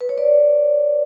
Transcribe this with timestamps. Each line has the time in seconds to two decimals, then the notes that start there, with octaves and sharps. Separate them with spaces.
0.01 B4
0.09 C#5
0.18 B4 D5